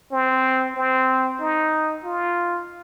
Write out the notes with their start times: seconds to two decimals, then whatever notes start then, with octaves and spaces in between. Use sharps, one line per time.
0.12 C4
0.76 C4
1.40 D#4
2.04 F4